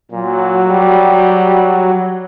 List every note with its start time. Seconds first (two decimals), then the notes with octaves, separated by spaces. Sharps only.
0.12 A#2 F#3
0.68 G3